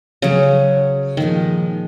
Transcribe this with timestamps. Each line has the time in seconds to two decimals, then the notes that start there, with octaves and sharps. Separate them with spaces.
0.22 C#3 F#3 C#4 G#4 C#5
1.17 A#2 D#3 F3 G#3